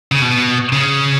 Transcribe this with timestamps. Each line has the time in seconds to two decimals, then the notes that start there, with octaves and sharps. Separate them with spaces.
0.12 C#3
0.22 B2
0.72 C#3